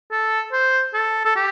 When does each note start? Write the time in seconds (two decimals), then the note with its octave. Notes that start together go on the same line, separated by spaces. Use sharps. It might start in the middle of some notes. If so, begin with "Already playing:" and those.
0.11 A4
0.53 C5
0.94 A4
1.25 A4
1.36 G4